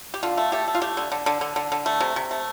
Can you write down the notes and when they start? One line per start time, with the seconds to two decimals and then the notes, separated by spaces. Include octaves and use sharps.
0.14 G4
0.23 D3 F4
0.37 A3
0.52 A3 G4
0.68 A3
0.75 F4
0.82 A3 G4
0.97 D3
1.12 D3
1.26 D3
1.41 D3
1.56 D3
1.72 D3
1.86 A3
2.01 C3
2.16 C3
2.31 A3